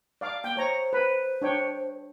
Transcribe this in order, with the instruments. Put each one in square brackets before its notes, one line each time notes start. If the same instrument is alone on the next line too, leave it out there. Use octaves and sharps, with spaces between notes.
[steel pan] D5 F5 D6
[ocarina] A#3 [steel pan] G5
[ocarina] C5 [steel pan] C#5 A#5
[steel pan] B4 B5
D4 C#5 G5